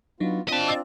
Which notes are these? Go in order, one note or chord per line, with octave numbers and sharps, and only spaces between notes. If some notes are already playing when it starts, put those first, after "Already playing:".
F#3 B3 D4 D#4 F4
C4 D4 F4 D#5 A5 B6
D6 E6 A6